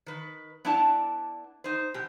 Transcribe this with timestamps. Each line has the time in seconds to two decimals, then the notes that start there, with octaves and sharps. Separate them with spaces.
0.06 D#3 B4
0.65 B3 D4 E4 D5 A5
1.64 D#4 C5
1.94 B2 G4